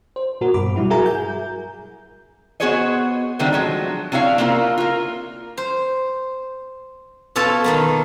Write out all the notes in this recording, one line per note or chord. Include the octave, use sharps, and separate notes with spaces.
C5
A#2 F#4 A#4
G2 B2 B5 D6
F#3 G3 E4 F#4
F#4 G#4 A#4 E5 G#5 A#5
G#5 G6
B3 F#4 G#4 C5 C#5 D#5
B2 D3 D#3 G3 A3 C4
F3 F#3 G#3
C3 D4 E4 C#5 F5
A#3 C4 E4 F4 A#4
F4 A#4
C5
B2 F4 A4 C#5 A5
D#3 A#3 B3